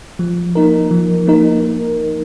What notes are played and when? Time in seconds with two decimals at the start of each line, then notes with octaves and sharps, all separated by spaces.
0.19 F3
0.55 A#3 D#4 A#4
0.91 F3
1.27 A#3 D#4 A#4